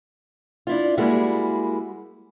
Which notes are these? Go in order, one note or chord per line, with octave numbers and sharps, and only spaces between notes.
D4 E4 F4
G3 G#3 A#3 E4 F#4 G#4